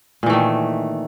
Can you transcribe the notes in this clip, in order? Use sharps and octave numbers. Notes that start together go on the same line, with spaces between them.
A#2 D#3 E3 A3